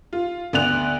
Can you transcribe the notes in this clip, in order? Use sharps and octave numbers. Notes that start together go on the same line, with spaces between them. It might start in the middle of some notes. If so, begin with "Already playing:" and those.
F4
D2 B3 D5 F#6 F7